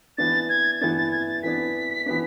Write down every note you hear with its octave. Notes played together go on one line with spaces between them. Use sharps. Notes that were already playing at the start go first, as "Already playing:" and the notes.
E3 B3 D4 A6
G#6
E3 B3 D4 A6
A6
G#6
A6
E3 B3 D4 B6
E3 B3 D4